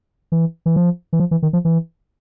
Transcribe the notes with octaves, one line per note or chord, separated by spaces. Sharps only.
E3
E3
F3
E3
F3
E3
D#3
F3
E3